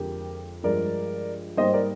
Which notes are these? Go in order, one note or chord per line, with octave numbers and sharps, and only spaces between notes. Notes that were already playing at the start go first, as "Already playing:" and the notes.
Already playing: F2 D3 G#3 G4 A#4
G2 F3 G#3 A#4 D5
G#2 G3 A#3 C5 D#5
A#4 D5